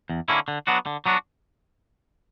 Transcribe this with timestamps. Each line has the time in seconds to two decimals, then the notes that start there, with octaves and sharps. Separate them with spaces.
0.09 E2
0.28 D3 A#3 C#4 E4
0.48 D3
0.67 F#3 B3 D4 F#4
0.86 D3
1.06 F#3 B3 D4 F#4